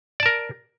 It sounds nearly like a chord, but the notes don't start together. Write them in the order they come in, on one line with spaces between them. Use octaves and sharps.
D5 A5 A#4